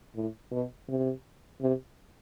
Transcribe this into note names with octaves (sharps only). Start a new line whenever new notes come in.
A2
B2
C3
C3